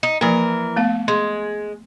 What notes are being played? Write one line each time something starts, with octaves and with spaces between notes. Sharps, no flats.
D#4
E3 F3 A#3 A#4
A3 B3 F5
G#3 C6